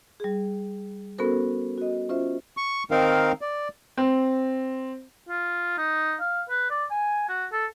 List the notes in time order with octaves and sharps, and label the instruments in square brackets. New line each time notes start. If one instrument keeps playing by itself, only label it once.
[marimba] G3 G#4
B3 C#4 F#4 A4 A#4 C5
F#4 D#5
C#4 F4 C5 E5
[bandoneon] C#6
D#3 C4 D#4 A#4 F5
D5
[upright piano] C4
[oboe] F4
D#4
F5
B4
D5
G#5
F#4
A4